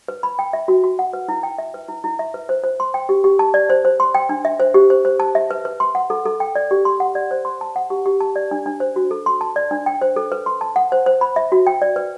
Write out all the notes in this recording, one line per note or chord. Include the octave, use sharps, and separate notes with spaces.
B4
B5
G5
E5
F#4
F#4
F#5
B4
E4
G5
E5
B4
E4
E4
E5
B4
C5
C5
C6
G5
G4
G4
A5
D5
C5
C5
C6
G5
D4
E5
C5
G4
C5
C5
A5
E5
B4
B4
C6
F#5
A4
A4
G5
D5
G4
C6
F#5
D5
C5
C6
A5
F#5
G4
G4
A5
D5
D4
D4
C5
F#4
A4
C6
A5
D5
D4
G5
C5
A4
B4
C6
A5
F#5
C5
C5
B5
E5
F#4
G5
D5
B4